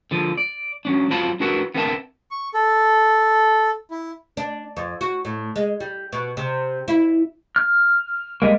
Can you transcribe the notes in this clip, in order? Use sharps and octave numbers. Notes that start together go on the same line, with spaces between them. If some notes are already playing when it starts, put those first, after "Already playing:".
D3 F3
D5
F#3 C#4 D4
F#3 C4 F4 A5 B5
D4 E4 F#4 A#4 B4 F#5
B3 C4 D4 A#4 E5 A5
C#6
A4
E4
D4
F2
F#4
A2
G#3
G3
B2
C3
E4
F6
G3 G#3 A#3